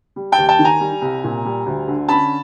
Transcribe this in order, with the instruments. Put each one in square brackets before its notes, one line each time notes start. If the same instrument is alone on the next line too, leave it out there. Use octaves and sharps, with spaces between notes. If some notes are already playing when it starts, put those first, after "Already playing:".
[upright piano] G3
G5 A5
D#2
G5 A5
D#3
G#5 A#5
G3
C2
A#2
G3
D2
D3
C#4 A5 B5